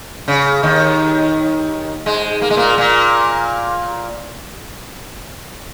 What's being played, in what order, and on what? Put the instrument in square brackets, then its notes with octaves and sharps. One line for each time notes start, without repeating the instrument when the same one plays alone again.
[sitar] C#3
D#2 D#3
G#2 G#3
A#3
G#3
A#2 A#3
A#2 A#3